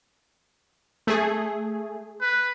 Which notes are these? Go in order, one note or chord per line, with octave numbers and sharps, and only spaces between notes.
A3 G#4
B4